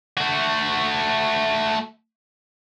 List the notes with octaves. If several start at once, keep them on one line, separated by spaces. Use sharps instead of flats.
A3 F#4